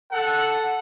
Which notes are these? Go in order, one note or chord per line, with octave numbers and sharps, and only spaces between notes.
A4 F#5